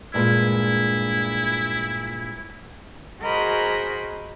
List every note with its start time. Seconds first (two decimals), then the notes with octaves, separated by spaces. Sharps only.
0.14 G2 A#2 G#3 E4
3.22 F#4 G#4 A#4 C5 D#5 B5